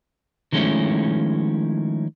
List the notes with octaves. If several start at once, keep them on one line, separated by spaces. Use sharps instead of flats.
D#3 F3 G#3 A3 C#4 E4